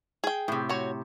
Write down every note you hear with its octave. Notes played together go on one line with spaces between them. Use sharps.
G#4 G5
A2 C3
F#4 C#5